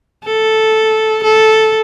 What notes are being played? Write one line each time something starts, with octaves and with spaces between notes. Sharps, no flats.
A4
A4